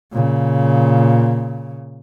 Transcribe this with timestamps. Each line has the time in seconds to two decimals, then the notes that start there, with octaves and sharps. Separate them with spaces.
0.12 A#2 C#3